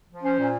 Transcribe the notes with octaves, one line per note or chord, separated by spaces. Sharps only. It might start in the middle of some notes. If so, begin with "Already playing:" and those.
F3
C#4 C5
A#2